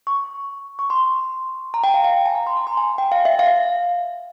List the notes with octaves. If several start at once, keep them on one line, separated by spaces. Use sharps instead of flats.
C#6
C#6
C6
A#5
G5
F5
F5
G#5
A#5
C6
A#5
C6
G#5
G5
F5
E5
F5